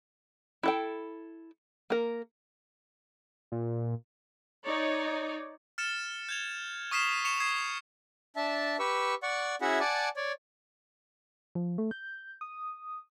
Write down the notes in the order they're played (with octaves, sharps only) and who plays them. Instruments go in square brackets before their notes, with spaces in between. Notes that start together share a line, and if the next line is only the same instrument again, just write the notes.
[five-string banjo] E4 A4 G5
A#3 A#4
[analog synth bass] A#2
[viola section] D#4 C#5 D5
[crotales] F6 A6 C#7 E7
G6 G#6 F7
C#6 D#6 F6 B6 C7 E7
C#6 C#7 E7 F7
D#6 G#6 C7 E7
[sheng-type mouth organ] D4 E5 A5
G4 B4 C#6 E6
D5 F#5 C#6
C#4 E4 F#4 G#4 E5 F#5
D5 F#5 G#5 A5 D6
C#5 D5
[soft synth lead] F3
A3
G6
D#6